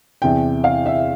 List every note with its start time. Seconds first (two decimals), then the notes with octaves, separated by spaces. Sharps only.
0.22 E2 C3 E3 G5
0.64 F5
0.86 E5